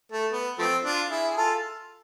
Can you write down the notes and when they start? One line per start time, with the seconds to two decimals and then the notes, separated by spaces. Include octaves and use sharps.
0.12 A3
0.32 B3
0.58 F3 A3 C4
0.84 D4 F4
1.10 E4 G#4
1.27 G#4
1.36 F4 A4